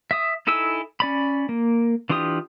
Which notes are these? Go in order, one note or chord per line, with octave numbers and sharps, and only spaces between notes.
E5 D#6
D#4 E4 A4 G#5 E6
C#4 D5 B5
A#3
E3 D4 F4 G4 D#6